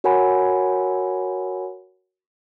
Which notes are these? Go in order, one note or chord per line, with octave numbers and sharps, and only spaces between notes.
F#4 A#4 C#5 F#5 G#5 B5